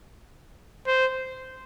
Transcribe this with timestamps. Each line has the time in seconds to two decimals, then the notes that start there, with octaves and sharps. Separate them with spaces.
0.87 C5